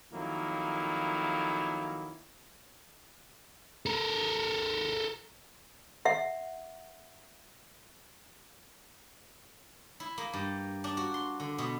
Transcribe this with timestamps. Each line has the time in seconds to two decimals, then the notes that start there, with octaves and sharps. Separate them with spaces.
0.13 F2 D#3 F#3 A#3 E4
3.86 A4 A#4
6.05 E5 F#5
10.00 E4
10.18 A#3
10.33 G2
10.84 D4
10.97 F#4
11.14 C6
11.40 D3
11.58 B2